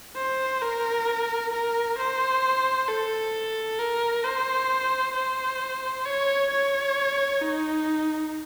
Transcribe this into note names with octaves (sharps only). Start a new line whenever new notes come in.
C5
A#4
A#4
C5
A4
A#4
C5
C5
C#5
C#5
D#4